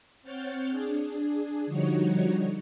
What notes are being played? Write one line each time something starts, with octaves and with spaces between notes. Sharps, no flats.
C4 C#5 F#5 F6 G6 A6
D4 G#4
D3 F3 G3 D#4 F#4 C#5